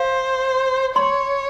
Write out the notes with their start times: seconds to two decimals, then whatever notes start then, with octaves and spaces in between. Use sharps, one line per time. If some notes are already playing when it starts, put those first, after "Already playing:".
Already playing: C5 F5
0.96 C#5 C6